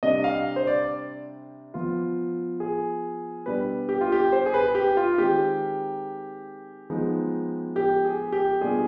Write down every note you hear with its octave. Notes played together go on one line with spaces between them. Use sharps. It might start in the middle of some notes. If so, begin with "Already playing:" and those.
C3 G3 D4 D#5
F5
C5
D5
F3 B3 F4
G#4
B2 G3 D4 B4
G4
F4
G4
C5
G#4
B4
G4
F4
D#3 G#3 C4 D#4 G4
F3 G#3 B3 D#4
G4
G#4
G4
B2 G3 D4 F4 G#4